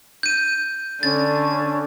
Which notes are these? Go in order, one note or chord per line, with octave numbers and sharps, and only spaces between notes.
G6 D#7
D3 C#4 A6